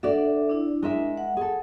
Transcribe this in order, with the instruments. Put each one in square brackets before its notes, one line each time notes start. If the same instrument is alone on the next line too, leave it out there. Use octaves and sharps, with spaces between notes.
[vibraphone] D4 A4 E5 [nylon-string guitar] F#4 D5
[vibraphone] D4 E4
[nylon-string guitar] G#3 A#4 E5
[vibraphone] F#5
[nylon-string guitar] G#4 A4